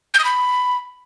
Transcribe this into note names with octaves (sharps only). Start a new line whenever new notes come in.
G6
D#6
B5